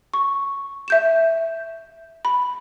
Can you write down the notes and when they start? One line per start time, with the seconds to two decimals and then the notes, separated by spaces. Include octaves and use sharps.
0.14 C#6
0.88 E5 G6 E7
2.25 B5